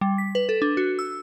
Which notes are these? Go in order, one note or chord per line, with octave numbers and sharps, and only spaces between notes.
G3
B6
B4
A4
D4
F#4
E6